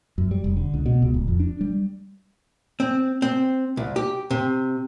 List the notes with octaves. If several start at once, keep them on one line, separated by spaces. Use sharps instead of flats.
F#2
G3
F1
D3
C#2
B2
C#2
D1
F2
D4
G3
C4
C4
C2
G4
C3